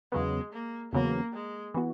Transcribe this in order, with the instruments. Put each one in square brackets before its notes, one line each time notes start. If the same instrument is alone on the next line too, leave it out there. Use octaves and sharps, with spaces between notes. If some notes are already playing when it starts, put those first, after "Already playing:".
[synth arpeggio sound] E2 C#3 F#3 B3 [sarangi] G#3
[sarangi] A#3
[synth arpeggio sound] E2 C#3 F#3 B3 [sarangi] A#3
[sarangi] G#3
[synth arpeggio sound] E3 B3 F#4